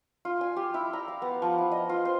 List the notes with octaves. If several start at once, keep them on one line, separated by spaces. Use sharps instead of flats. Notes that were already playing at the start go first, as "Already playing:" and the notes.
F4
G#5
G4
E4
A#5
F5
B3
F3
E4
D#5
F4
C5